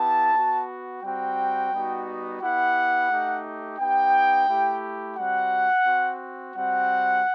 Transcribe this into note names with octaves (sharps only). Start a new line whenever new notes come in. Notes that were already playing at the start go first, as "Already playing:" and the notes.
Already playing: B3 E4 G4 A5
B3 F#4
G3 C4 F#4 G5
G3 B3 D#4 F#4
B3 E4 G4 F#5
A3 D#4 G4
B3 D#4 G4 G5
A3 E4 G4
G3 C4 F#4 F#5
C4 F#4
G3 C4 F#4 F#5